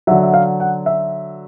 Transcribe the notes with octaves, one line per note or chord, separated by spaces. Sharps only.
D3 F#3 E5
E5
F5
F#5
E5